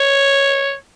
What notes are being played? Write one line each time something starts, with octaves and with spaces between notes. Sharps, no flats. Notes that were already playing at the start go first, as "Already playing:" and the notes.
Already playing: C#5